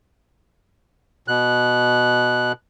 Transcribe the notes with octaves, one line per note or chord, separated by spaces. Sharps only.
B2 F#6